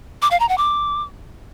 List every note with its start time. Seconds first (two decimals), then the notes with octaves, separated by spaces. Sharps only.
0.22 D6
0.31 F5
0.40 A#5
0.49 F#5
0.58 D6